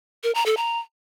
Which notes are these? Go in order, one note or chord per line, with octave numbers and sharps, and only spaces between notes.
A#4
A#5
A4
A#5